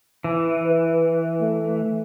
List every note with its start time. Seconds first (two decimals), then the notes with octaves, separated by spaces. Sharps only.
0.24 E3
0.66 B4
1.41 A3